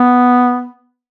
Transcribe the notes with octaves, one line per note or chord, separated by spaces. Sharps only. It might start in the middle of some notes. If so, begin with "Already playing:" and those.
Already playing: B3